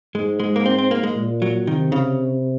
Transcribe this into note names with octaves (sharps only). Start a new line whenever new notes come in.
G#2 G#3
G#3
A#3
C4
C4
A#3
G#3
A#2
F#3
C3 D#3
C#3